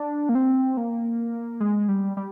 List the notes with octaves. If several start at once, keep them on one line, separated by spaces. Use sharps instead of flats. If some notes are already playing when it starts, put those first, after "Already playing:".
Already playing: D4
A#3
C4
A#3
G#3
G3
G3